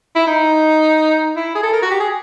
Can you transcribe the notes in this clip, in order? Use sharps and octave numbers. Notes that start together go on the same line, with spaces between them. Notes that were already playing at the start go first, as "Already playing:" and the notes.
E4
D#4
E4
G#4
A4
A#4
F#4
G4
G#4